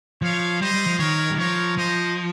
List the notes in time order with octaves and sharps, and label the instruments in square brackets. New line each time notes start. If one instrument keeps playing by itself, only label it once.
[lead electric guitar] F3 [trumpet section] C#5 F5
[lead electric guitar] G3 [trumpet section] C5 D#5
[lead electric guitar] G3
F3
[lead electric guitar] D#3 [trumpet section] A#4 C#5
[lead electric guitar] G3
[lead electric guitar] F3 [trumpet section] A#4 C#5
[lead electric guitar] F3 [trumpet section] C5 D#5